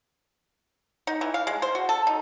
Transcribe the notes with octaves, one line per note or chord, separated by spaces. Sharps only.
D#4
E3
F5
G#3
C5
F#4
A4
D#4